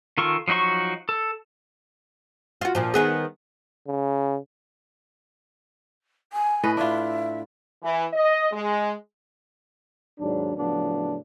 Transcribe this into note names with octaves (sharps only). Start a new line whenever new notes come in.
D#3 F4 A4 C#6
F3 F#3 D#4 F#4 C#6
A4
F4 F#4
A#2 F3
D#3 B3 G#4
C#3
G#5
A2 B4 D#5
D4 F4 E5
E3
D#5
G#3
D#2 G#2 F#3 D4
A2 C#3 F3 F#3 B3 D4